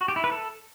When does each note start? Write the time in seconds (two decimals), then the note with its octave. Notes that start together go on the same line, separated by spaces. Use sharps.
0.01 F#4
0.08 G4
0.16 E4
0.24 B4
0.32 A4